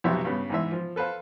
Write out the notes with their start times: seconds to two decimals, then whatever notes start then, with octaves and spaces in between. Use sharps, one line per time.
0.04 B1 F2 C3 F#4 E5
0.25 G2 C#3 B3
0.50 G#2 E3 E5
0.72 F3
0.96 A4 B4 C5 F5